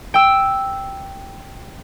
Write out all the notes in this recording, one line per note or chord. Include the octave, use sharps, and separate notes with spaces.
G5 E6